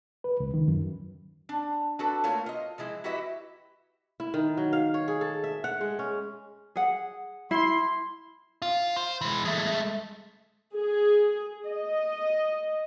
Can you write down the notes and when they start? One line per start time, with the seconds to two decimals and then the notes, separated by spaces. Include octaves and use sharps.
0.24 B4
0.40 C#2
0.54 D#3
0.68 F#2
1.49 D4
1.99 D4 F#4 A4 B4
2.24 A3 A#3 F4 C#5
2.46 F4 D#5
2.78 E3 F3 G#3 E4
3.04 E4 F#4 G4 B4 D#5 E5
4.20 E4
4.34 D#3
4.57 F#3
4.73 F5
4.94 C#5
5.08 G#4
5.21 A4
5.44 E5
5.64 F#5
5.81 G#3
5.99 C#4
6.76 G#4 F#5
7.51 E4 C6
8.62 F4
8.96 C5
9.21 E3 G#3
9.45 G#3 A3
10.76 G#4
11.67 D#5